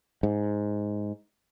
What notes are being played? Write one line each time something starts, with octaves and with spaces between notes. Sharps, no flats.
G#2